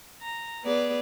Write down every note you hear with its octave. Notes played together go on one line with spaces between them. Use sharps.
A#5
B3 G#4 B4 D5